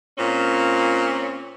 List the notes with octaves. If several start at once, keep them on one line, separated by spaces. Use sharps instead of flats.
A#2 C4 C#4